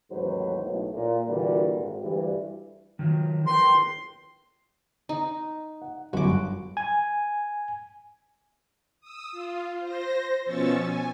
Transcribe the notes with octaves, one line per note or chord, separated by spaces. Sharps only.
A1 D#2 G#2 F#3 B4 C5
B1 A2
A#2
G2 A#2 D3 E3 G3 F#4
G#1
D2 G2 E3 G3
D#3 F3 F#3
A#4 B4 G5 C6
D#4
F#5
G1 F#2 F#4 D6
G#5
D#6 E6
F4
C5 A#6
B2 F3 C#4 C#6 E6 A6
G#5